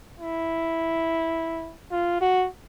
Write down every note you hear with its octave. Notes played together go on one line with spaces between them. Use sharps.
E4
F4
F#4